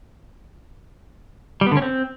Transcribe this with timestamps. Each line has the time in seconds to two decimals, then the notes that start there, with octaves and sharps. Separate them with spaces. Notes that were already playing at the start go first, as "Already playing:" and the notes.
1.61 G3
1.66 B3
1.72 D3
1.77 C#4
1.82 C4